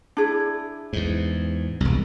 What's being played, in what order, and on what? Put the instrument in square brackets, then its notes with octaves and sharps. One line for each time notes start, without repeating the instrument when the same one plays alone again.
[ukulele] D4 E4 G#4
[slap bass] E2 G#2
E1 C2